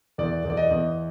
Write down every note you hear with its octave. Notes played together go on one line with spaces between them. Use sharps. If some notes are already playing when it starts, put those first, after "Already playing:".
E2 D5
E2
D5
D#5
E2